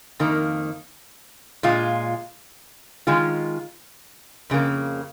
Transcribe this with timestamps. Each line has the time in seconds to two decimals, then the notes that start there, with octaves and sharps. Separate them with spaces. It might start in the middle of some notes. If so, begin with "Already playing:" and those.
0.19 F2 D#3 A#3
1.63 A#2 G#3 F4
3.07 D#3 G#3 F4
4.50 F2 C#3 A#3